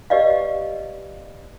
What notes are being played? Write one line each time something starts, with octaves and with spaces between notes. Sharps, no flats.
G4 B4 D5 D#5 F5